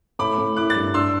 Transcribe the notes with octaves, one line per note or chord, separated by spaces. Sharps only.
A2 B5 D6
A2
E4 D6 F#6
F#6 A6
G2
D4 C6 E6